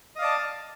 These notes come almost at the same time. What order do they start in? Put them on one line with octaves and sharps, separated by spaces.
D#5 F5 D5 A5